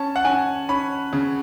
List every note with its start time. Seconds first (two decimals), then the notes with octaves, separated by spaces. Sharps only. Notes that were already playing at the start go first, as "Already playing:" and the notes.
Already playing: C#4 A5
0.16 F#5
0.24 C#4 G#5
0.69 C#4 B5
1.13 C#3